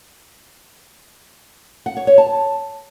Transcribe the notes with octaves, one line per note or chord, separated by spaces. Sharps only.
F#5
C#5
C#5
A5